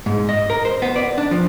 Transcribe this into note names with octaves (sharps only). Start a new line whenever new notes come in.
G#2
D#5
A#4
C5
B3
D5
D4
F3